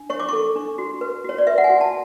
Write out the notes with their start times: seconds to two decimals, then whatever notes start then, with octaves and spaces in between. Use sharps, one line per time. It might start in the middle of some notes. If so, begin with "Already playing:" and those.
Already playing: D4
0.10 C#5 C#6
0.20 D6
0.29 A4 C#6
0.56 D4
0.78 F#4
1.01 B4
1.24 F#4 C#5
1.38 D5
1.47 B4 E5
1.58 F#5
1.64 G#5
1.70 F#4
1.81 A5